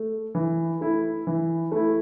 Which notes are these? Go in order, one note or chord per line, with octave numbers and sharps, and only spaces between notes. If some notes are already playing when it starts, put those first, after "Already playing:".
Already playing: A3
E3
A3 E4
E3
A3 E4